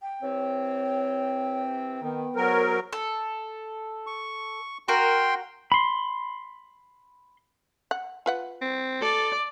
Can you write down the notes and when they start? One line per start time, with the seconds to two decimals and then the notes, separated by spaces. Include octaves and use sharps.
0.02 G5
0.22 C3 E3 C4 C#5
2.02 D#3 B3
2.36 E2 A2 F#3 A#4 C5
2.93 A4
4.07 C#6
4.88 F#4 A#4 G5 C6
5.72 B5 C6
7.91 F#5
8.26 F4 B4 F#5
8.62 C4
9.02 A4 D5